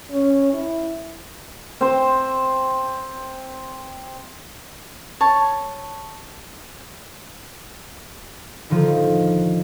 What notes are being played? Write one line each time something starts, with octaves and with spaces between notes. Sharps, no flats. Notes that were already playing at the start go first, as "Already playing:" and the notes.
C#4
E4
C4 C5
C#5 A5
A2 D3 D#3 F3